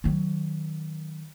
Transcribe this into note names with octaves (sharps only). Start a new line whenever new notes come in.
D#3 F#3